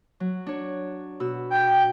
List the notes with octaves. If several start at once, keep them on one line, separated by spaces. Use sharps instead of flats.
F#3
D4 C#5
B2 F#4 E6
G5